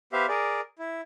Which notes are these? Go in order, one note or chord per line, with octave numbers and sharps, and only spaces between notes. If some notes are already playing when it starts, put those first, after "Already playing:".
B3 G4 C5 E5 F5
G#4 A#4 D5
E4